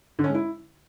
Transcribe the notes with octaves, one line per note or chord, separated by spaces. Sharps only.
D3
C#4
G#3
E4